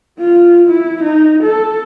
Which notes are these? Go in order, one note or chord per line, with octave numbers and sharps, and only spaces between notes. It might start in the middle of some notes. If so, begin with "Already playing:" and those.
F4
E4
D#4
A4